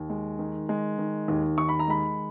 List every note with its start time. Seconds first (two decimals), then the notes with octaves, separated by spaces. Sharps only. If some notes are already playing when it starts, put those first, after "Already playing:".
Already playing: D#2
0.10 G#3
0.39 D#3
0.69 G#3
0.98 D#3
1.28 D#2
1.58 D#3 C#6
1.69 B5
1.79 A#5
1.88 G#3 B5